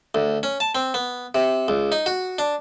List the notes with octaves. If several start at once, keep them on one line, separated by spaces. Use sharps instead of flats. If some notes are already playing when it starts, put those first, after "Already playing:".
D2
C#4
A5
C4
B3
C3
C#2
D#4
F#4
D4